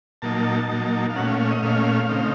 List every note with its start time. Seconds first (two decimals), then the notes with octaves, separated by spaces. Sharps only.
0.22 A#2 F#3 A#3 D#4 A5
0.69 A#2 F#3 A#3 D#4
1.10 F5
1.16 A#2 A3 C#4 F#5
1.27 F5
1.39 F5
1.51 D#5
1.63 A#2 A3 C#4 F5
2.09 C#3 A3 C4 D#4